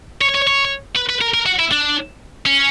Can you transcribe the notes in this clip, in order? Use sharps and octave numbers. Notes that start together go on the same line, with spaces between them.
C#5
C#5
C#5
B4
B4
A#4
A#4
F#4
E4
D4
C#4